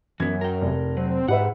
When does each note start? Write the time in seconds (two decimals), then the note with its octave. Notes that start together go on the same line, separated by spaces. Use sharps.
0.20 F#2 E3 B3 G#6
0.41 A#4 G5
0.61 F1
0.97 F#3 C4
1.28 G#2 G4 B4 E5 F#5